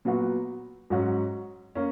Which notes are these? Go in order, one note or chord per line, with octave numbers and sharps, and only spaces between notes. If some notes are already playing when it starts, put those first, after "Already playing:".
A#2 F#3 B3 F#4
G#2 F#3 C#4 F#4
A#3 C#4